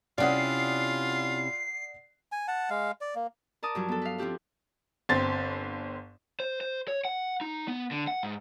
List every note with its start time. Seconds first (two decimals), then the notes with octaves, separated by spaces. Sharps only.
0.18 C3 C#4 E4 F4 D5 F#5 D#6 C7
2.32 G#5
2.48 F#5 A5
2.70 G#3 F5
3.01 D5
3.15 A#3
3.63 A#4 D5 A5 D#6
3.75 G2 F3 F#3
3.89 B3 A4
4.02 B4 F5
4.18 F3 C4 E4 G4 B4
5.09 G1 C4 A6
6.40 C5
6.61 C5
6.88 C#5
7.05 F#5
7.41 D#4
7.68 B3
7.91 D3
8.07 F#5
8.23 G#2